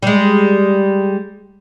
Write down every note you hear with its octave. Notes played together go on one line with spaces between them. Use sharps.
G3 G#3